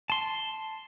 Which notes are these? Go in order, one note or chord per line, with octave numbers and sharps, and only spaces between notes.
A5 C6